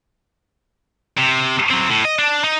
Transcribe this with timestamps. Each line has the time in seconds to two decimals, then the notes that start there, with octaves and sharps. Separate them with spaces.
1.18 C3
1.71 F#3 C4
1.89 A2
2.05 D#5
2.19 D4
2.44 D#4